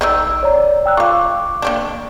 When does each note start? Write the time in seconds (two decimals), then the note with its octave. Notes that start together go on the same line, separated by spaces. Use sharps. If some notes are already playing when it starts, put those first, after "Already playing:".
0.01 A1 D#3 G3 D#4 E6
0.43 C#5 D5 A#5
0.86 G5 E6 F#6
0.97 F4 F5 C#6 D6
1.62 A#3 C4 D4